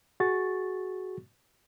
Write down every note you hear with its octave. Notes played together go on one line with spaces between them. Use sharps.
F#4 G#4 C#6 A6